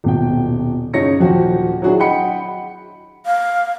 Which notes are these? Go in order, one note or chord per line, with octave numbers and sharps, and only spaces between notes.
D#1 B2 G5
F#2 C#3 D#4 C#5 A#6 C#7
D#1 F3 F#4 G5
F#3 D4 E4 F#4 G#4
D#5 F#5 G5 B5 C#7
F5